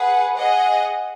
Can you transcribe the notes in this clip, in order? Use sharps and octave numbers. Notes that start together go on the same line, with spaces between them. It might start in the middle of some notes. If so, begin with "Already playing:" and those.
Already playing: G#4 B4 F#5
G#4 D#5 F#5